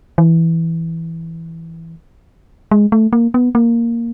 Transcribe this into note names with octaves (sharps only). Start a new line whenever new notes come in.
E3
G#3
A3
A#3
B3
A#3